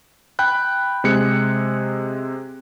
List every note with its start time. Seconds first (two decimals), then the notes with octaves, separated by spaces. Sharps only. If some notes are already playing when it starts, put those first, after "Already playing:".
0.39 G5 B5 F#6
1.04 C3 G#3 G#4 F#6 C#7